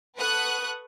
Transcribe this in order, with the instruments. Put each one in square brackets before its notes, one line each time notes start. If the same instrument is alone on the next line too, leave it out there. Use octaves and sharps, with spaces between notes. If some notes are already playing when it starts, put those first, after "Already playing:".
[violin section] A4 B4 F#5 C#6 D#6 F#6